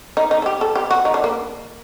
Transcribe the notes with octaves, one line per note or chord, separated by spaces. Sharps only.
D#4
D#4
A4
G4
A4
G4
F#4
D#4
D4
A#3